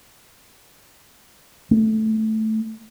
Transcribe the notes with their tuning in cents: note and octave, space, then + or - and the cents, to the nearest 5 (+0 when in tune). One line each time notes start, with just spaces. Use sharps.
A3 -5